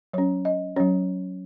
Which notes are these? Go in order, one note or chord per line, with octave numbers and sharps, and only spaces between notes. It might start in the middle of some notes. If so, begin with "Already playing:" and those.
F#3 C#4 C#5
D#5
F#3 C#4 C#5